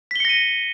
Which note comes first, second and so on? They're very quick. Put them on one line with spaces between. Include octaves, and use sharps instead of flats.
B6 G7 C#7 A#6 D#7